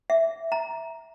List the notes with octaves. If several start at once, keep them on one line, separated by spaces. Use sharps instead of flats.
E5
A#5